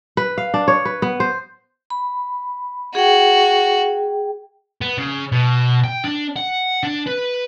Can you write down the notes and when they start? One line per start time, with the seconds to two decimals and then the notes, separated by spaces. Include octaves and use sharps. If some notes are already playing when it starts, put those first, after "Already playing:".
0.17 B4
0.38 F5
0.54 D4
0.68 C#5
0.85 B4
1.02 B3
1.20 C5
1.90 B5
2.95 F#4 G#4 G5
4.82 B3
4.98 C#3
5.32 B2
5.84 G5
6.04 D4
6.36 F#5
6.83 D4
7.07 B4